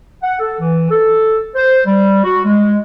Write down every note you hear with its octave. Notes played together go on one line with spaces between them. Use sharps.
F#5
A4
E3
A4
C5
G3
F#4
G#3